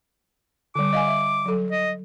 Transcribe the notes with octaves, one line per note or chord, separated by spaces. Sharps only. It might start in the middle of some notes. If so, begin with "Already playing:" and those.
D3 G3 D6
D#5 F5 G#5
E5
F#3 A4
D#5